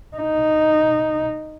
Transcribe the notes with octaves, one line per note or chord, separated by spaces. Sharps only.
D#4